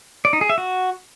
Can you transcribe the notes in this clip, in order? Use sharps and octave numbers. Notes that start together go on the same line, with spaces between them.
D5
D#4
G#4
E5
F#4